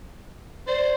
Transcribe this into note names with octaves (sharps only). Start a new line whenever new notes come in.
C5 D5